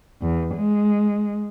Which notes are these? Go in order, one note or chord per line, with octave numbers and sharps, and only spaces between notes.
E2
G#3